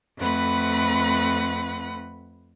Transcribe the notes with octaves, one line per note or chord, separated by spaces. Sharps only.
F2 A3 C4 B4 F#5 B5